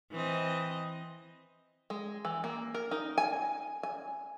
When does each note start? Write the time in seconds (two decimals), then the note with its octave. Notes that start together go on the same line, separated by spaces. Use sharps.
0.12 E3 C4 D#5
1.90 G#3
2.25 E3
2.44 A#3
2.74 A#4
2.91 D#4
3.18 G#5
3.83 G#5